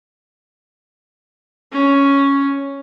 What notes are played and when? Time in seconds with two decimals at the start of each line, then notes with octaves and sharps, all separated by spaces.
1.72 C#4